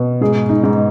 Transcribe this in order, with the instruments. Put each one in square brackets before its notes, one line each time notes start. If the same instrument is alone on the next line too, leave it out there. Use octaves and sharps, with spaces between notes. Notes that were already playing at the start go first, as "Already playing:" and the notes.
Already playing: [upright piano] B2
G#2 G#4
D#4
G#2